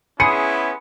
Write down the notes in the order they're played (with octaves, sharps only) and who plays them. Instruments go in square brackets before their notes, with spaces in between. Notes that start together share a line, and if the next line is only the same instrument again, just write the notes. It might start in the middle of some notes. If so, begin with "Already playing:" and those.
[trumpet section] B3 C#4 E4 [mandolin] G#4 [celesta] B5 C6 [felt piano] C#7